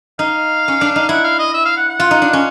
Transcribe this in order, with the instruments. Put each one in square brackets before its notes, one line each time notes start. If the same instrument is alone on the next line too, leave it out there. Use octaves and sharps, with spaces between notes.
[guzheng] D#4 [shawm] F5
[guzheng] C#4
D4
D#4
[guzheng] E4 [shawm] F#5
[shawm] F5
D#5
E5
F5
F#5
F#5
[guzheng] F4
D#4
D4
C#4